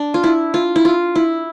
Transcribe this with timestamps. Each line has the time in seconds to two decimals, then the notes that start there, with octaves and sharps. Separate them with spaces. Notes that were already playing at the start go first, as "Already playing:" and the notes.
Already playing: D4
0.14 F4
0.24 E4
0.54 F4
0.76 E4
0.85 F4
1.15 E4